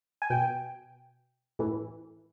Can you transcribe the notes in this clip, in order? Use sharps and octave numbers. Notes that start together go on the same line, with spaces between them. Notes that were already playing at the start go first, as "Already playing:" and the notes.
G#5
B2 G5
A2 E3